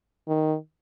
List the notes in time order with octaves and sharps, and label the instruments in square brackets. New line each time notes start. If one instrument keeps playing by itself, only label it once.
[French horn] D#3